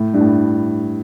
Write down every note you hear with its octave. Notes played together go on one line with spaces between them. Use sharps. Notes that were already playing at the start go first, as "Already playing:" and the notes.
Already playing: A2
G2
A2